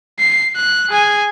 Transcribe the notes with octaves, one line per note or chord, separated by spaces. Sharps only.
C7
F#6
G#4 G#5